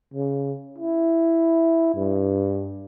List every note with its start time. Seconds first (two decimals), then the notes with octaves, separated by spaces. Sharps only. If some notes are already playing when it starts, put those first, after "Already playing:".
0.14 C#3
0.78 E4
1.95 G2